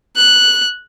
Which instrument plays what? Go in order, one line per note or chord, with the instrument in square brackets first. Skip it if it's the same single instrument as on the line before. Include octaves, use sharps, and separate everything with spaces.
[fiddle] F#6